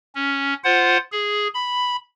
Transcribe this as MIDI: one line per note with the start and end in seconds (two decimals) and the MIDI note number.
0.15 0.54 61
0.64 0.97 65
0.64 0.97 72
0.64 0.97 78
1.12 1.48 68
1.54 1.96 83